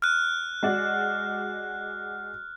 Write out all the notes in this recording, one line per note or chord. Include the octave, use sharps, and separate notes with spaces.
F6 F#6
G#3 F#4 D5